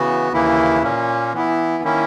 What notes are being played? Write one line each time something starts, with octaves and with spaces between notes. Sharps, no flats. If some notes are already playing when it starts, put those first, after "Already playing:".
Already playing: C#3 E3 B3 F#4
D#2 C#3 E3 A#3 E4
A#2 A#3 C#4
E3 B3 E4
D#3 A#3 C#4 E4